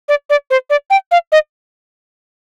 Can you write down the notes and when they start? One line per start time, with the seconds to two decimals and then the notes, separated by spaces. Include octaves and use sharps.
0.09 D5
0.30 D5
0.50 C5
0.70 D5
0.90 G5
1.11 F5
1.32 D#5